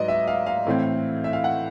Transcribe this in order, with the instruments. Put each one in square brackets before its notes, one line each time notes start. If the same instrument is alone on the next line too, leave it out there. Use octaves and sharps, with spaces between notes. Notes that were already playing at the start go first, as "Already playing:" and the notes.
Already playing: [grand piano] G#2 F#3 B4 D5 D#5
E5
F5
F5
A2 E3 A3 C4
E5
F5
F#5